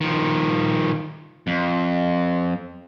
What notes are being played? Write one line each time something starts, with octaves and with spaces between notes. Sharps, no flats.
D#3 F3
F2